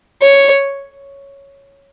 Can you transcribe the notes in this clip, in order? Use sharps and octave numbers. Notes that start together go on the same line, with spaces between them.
C#5